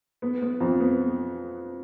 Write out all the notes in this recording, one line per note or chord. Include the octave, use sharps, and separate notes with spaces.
B3
B3
F2
B3